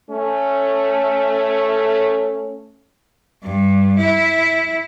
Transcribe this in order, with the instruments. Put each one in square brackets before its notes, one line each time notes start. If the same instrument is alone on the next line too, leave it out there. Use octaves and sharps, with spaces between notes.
[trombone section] A3 C#4
[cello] G2
E4